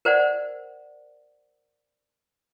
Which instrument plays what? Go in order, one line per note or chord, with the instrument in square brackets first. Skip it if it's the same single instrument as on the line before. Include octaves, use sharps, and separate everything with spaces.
[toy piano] A#4 C5 D5 F#5